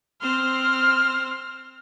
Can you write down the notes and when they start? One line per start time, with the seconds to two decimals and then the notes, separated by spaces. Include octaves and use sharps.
0.21 C4 C5 F6